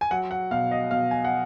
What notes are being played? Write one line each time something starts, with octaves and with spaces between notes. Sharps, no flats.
G#5
F#3 F#5
F#5
B2 F5
D#5
B2 F5
G#5
F#5